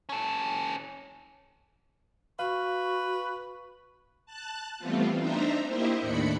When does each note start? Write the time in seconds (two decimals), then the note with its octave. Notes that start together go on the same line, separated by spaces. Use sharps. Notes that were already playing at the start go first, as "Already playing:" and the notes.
0.09 C#4 A4
2.39 F#4 B4 F5 C#6
4.26 A5 F#6
4.79 E3 G3 A3 B3 C4 F4
5.17 D4 D#4 C5 E5 A#5
5.67 A#3 E4 G4 C5 D#5 E5
5.99 D#2 A2 D#3 D4 B5 C#7